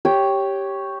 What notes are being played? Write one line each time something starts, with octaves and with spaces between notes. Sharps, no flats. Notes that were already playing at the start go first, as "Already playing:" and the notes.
G4 C#5 G5